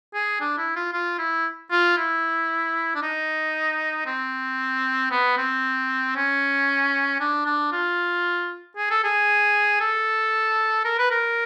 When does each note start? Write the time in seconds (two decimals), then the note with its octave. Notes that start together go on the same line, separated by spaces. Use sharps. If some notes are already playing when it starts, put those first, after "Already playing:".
0.14 G#4
0.41 D4
0.58 E4
0.76 F4
0.93 F4
1.18 E4
1.71 F4
1.97 E4
2.95 D4
3.02 D#4
4.06 C4
5.11 B3
5.37 C4
6.16 C#4
7.20 D4
7.46 D4
7.72 F4
8.77 G#4
8.90 A4
9.04 G#4
9.80 A4
10.85 A#4
10.98 B4
11.11 A#4